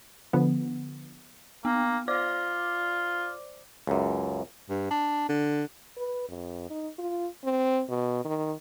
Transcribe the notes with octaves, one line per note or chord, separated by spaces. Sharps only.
D3 F3 B3
A#3 B3
F4 C5 D5 D6
C#2 F#2
G2
D4
D3
B4
F2
D#4
F4
C4
B2
D#3